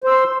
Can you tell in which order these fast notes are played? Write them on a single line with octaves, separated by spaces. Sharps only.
C5 E6 C6